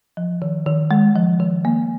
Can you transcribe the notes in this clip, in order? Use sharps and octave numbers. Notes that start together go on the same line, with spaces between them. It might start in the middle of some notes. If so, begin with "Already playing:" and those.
F3
D#3
D#3
G#3
F3
D#3
A#3